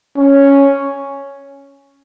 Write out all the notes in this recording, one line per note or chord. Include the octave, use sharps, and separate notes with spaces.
C#4